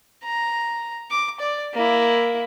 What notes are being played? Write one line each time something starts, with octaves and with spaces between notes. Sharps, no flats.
A#5
D6
D5
A#3 E4